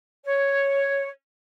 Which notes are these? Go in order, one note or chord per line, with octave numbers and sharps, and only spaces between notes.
C#5